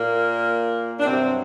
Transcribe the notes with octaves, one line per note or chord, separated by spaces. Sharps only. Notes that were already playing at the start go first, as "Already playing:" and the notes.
Already playing: A#2 A#3
D4
G2 C3 F#3 C4